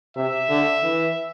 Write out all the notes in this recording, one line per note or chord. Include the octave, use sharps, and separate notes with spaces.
C3 E5
D3
E3